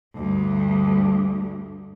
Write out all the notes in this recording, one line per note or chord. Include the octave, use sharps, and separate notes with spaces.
D2 G2